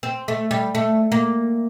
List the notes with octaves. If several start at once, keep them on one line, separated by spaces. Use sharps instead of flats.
C4
A3
G3
A3
A#3